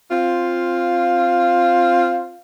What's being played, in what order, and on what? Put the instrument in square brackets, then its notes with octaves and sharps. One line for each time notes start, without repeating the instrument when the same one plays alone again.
[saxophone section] C4 F4